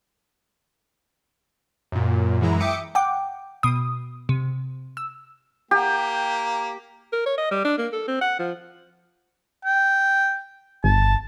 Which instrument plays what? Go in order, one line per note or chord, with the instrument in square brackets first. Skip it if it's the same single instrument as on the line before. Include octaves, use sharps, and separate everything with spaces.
[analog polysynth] F#2 A#2
F#2 E3 G#3 E4 A#5
E5 G5 D6 D#6 C#7
[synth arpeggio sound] F#5 G5 D6
B2 D#6
C3
E6
[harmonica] A#3 G5 [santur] G4
[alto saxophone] A#4
C#5
D#5
G3
D4
A#3
A4
C4
F#5
F3
[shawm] G5
[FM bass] G1 [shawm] A5